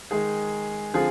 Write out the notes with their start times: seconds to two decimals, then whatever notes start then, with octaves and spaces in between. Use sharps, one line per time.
0.11 D#3 G#3 D#4 G#4
0.94 D3 F3 C4 F4 G#4